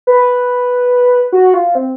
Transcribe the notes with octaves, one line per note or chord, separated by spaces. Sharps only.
B4
F#4
F4
C4